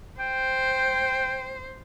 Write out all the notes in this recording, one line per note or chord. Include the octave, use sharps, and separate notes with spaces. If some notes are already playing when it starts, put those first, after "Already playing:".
C5 G5